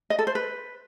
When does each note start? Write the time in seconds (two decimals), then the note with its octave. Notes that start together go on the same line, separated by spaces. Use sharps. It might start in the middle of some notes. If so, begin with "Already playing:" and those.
0.10 D#5
0.19 A4
0.27 C5
0.35 B4